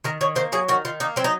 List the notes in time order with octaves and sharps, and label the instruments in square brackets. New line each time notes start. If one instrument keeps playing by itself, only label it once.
[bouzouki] D#3 A#4
D#3 C#5
A#3 C5
F#3 G#4
D#3 F#4
D#3 F4
A#3 D#4
F#3 C4
D#4